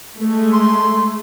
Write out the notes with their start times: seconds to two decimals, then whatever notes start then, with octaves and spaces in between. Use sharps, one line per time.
0.18 G#3 A3
0.53 C6